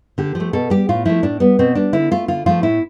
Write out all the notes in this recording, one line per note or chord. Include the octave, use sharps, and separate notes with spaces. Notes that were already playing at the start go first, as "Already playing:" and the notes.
D3 G4
F3
A3
B2 A4
G3 G4
A2 F4
F3 A3 E4
A2 D4
G3 B3
B2 C4
G3 D4
D3 E4
A3 F4
D3 F4
F3 A3 F4
A2 E4